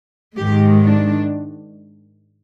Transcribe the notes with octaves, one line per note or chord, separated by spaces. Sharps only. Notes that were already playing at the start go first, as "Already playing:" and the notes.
G#2 D#3 G#3 G4
D4